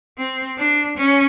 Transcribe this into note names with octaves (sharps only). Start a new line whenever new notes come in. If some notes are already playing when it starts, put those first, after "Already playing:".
C4
D4
C#4